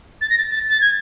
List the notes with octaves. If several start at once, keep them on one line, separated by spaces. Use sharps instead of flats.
A6
A#6
A6
A6
A6
G#6